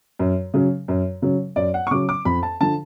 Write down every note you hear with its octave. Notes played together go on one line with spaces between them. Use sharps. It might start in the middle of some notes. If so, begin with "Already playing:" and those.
F#2
C#3 F#3
F#2
C#3 F#3
F#2 D5
F#5
C#6
C#3 F#3 D6
D6
F2 B5
A5
D3 F3 A5